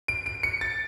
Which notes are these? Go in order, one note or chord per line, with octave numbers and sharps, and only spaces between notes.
D7
D7
C#7
A6